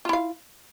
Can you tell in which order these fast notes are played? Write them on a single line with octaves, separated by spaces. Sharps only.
F4 E4 F5